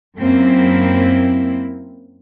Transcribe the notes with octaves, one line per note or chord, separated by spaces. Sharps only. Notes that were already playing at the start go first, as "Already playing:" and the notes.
F#2 A#3 C4 E4